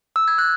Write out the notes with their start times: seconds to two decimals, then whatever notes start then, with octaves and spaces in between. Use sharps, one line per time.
0.16 E6
0.28 G#6
0.38 F#6